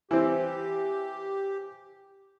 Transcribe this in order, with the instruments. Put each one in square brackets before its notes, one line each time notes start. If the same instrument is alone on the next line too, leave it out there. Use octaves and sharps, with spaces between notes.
[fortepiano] E3 C4 [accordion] G4